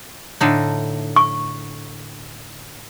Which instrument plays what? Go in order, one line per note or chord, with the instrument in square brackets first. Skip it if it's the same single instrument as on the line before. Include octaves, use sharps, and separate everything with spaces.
[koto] A2 D3 D#4
[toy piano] C#6